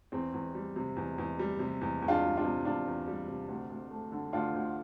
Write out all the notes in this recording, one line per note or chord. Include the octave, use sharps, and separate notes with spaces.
E2 C4
E2
G3
C3
E2
E2
G3
C3
E2
E2
D4 F4
G3
D4 F4
C3
E2 D4 F4
E2
G3
C3
D2
D2
A3
D3
D2 D4 F4
D2